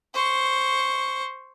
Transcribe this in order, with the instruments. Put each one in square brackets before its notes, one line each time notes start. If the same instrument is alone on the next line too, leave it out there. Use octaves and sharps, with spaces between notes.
[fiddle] C5 C#6